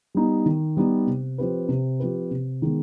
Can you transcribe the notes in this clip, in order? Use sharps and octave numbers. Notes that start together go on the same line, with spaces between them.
G3 B3 D#4
D#3
G3 B3 D#4
C3
F3 C4 G4 B4
C3
F3 C4 G4 B4
C3
D#3 G#3 B3